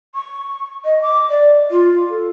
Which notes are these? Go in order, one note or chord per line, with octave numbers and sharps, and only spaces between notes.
C#6
D#5
D6
D5
F4
A4